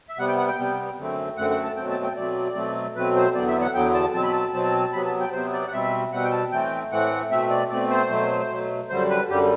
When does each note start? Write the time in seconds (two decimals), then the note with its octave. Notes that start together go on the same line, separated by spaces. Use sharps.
0.09 E5
0.18 C3 G3 B3 F#5
0.28 G5
0.38 F#5
0.48 G5
0.58 C3 G3 B3
0.97 F#2 D3 A3 C4
1.37 F#2 D3 A3 C4 F#5
1.50 F#5
1.63 A5
1.76 B2 F#3 A3 C4 G5
1.90 A5
2.04 G5
2.16 B2 F#3 A3 C4 D5
2.55 B2 F#3 A3 C4
2.95 B2 F#3 A3 C4 B4
3.16 C5
3.35 E2 D3 F#3 B3 D5
3.48 E5
3.62 F#5
3.74 E2 D3 F#3 B3 G5
3.94 A5
4.14 B2 F#3 C4 A5
4.23 B5
4.33 A5
4.53 B2 F#3 C4 A5
4.93 C3 F#3 B3 B5
5.06 A5
5.20 G5
5.32 C3 F#3 B3 C5
5.53 D5
5.68 F#5
5.72 B2 G3 C4 E5
6.12 B2 G3 C4 F#5
6.24 G5
6.32 A5
6.52 A2 E3 A3 C4 G5
6.91 A2 E3 A3 C4 F#5
7.30 B2 A3 C4 E5
7.51 D5
7.70 B2 A3 C4 D5
7.90 C5
8.10 B2 F#3 A3
8.50 B2 F#3 A3
8.89 F#2 D3 G3 C5
9.10 B4
9.29 F#2 D3 G3 G4